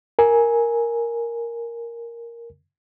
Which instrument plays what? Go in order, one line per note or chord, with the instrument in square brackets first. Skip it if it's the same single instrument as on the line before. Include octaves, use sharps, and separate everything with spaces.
[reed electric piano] A#4 G#5